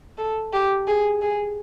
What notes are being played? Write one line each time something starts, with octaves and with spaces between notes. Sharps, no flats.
A4
G4
G#4
G#4